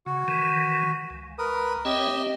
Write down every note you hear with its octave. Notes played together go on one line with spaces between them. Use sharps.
C#3 F#4
D#3 E3
C#2
A#4 B4 D#6
C4 G4 C#5 D#5 E5
C4